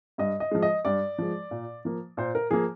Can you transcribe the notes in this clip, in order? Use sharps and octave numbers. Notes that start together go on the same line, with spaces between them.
G2 D#5
D#5
F3 G#3
D#5
G2 D5
F3 G#3
A#2
F3 A#3
A#2 C5
A#4
F3 A#3 G#4